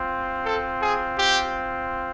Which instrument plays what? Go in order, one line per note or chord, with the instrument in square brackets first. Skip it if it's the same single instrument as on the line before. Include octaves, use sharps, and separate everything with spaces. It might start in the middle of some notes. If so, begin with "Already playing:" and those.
Already playing: [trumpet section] C4 F4
A4
G#4
G4